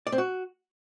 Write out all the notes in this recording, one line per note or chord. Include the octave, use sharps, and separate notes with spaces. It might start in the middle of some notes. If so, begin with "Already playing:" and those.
D5
C4
F#4